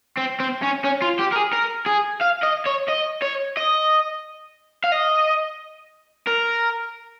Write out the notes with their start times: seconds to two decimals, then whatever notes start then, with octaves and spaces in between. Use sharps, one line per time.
0.17 C4
0.40 C4
0.63 C#4
0.85 C#4
1.02 F4
1.19 G4
1.32 A#4
1.35 G#4
1.53 A#4
1.86 G#4
2.21 F5
2.43 D#5
2.66 C#5
2.89 D#5
3.22 C#5
3.57 D#5
4.84 F5
4.92 D#5
6.27 A#4